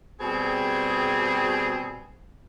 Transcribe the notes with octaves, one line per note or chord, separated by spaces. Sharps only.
B2 G3 C4 G#4